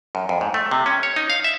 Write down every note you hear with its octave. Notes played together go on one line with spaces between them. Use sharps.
F#2
F2
G#2
A3
C3
C#4
C#5
D#4
F5
E5